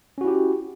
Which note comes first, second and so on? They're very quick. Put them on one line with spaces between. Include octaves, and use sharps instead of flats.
C#4 F#4 E4 G4